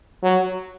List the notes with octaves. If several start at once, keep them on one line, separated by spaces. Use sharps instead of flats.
F#3